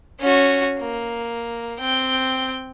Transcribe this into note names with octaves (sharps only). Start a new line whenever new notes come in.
C#4 F#4
A#3
C4 G5